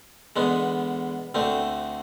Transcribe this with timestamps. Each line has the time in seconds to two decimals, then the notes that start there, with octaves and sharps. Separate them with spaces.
0.36 E2 D3 G#3 B3
1.34 D2 D3 A3 C4